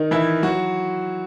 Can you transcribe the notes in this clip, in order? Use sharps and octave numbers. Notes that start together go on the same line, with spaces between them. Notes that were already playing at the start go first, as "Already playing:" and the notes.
Already playing: D#3 D#4
E3 E4
F#3 F#4